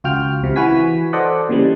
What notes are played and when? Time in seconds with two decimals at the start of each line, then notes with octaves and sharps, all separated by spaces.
0.04 C#2 F4 F#4 G5 F6
0.43 C#2 C3
0.56 E3 F#4 B4 G#5 B6
1.13 A4 C5 D5 D#5 F#5
1.49 A#2 C#3 E3 G3